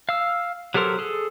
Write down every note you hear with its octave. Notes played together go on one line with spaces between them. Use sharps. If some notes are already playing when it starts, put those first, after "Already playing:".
F5 E6
F#3 G4 A4 A#4 C5
G#4 A4